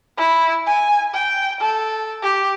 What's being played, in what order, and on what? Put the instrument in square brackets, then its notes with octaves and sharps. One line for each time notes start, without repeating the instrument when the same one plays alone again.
[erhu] E4
G#5
G5
A4
G4